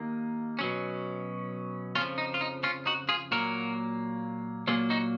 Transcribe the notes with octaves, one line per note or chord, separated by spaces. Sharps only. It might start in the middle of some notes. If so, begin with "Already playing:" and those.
Already playing: D#2 D#3 A#3
B2 F#3 C#4
F2 C#3 F3 C#4 F4
D#4
F4
D#4
C#4 F4
D#4 F#4
F4 G#4
A#2 F#3 A#3 F#4 A#4
A#2 F#3 A#3 F4 G#4
D#4 F#4